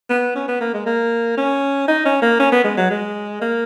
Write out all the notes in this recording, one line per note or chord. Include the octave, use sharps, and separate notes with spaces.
B3
C#4
B3
A#3
G#3
A#3
C#4
D#4
C#4
A#3
C#4
B3
G#3
F#3
G#3
A#3